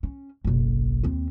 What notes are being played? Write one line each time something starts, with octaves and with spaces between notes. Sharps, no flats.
C#4
F#1 B1
D#2 C4